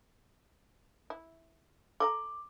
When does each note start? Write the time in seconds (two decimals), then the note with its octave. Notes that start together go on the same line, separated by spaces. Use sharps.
1.10 E4
2.00 A4 D#5 A#5 D6